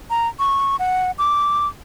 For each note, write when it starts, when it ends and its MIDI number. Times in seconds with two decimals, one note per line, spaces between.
0.10 0.28 82
0.39 0.76 85
0.79 1.11 78
1.18 1.68 86